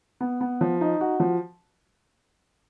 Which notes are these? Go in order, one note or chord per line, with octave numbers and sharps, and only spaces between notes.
B3
B3
F3
D#4
F#4
F3